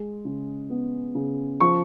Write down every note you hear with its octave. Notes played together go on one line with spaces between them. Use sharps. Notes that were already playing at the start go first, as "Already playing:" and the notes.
Already playing: G#3
C#3
B3
C#3
F3 C#6